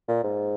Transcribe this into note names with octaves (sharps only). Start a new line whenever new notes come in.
A#2
G#2